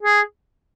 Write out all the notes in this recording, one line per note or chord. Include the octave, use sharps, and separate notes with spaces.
G#4